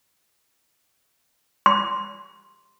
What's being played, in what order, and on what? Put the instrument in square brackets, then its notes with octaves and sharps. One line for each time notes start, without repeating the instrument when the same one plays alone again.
[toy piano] C6